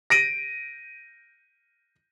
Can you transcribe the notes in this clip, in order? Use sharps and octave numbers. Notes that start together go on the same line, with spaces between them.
A#6 D7 D#7